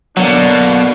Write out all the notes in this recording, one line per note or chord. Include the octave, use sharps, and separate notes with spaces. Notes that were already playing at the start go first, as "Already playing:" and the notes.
B2 D3 F#3 A#3 D4